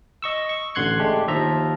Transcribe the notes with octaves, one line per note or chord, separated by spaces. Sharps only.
D#5 C#6 E6
C#6
A1 D3 C6 F#6 G#6 C#7
G#3 A3 D4 G4
D#2 F3 F4 E5 A#5